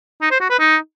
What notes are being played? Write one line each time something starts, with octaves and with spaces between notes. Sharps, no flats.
D#4
C5
F#4
B4
D#4